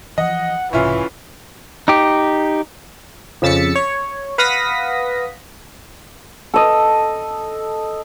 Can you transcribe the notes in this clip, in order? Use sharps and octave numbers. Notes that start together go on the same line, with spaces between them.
E3 F3 D#5 F#5
B1 G#2 C3 E3 C#4 E4 F4
D#4 G4
F2 C#3 E6 A6 B6 C#7
C#5
B4 F5 F#5 D#6 A#6 B6
A4 D#5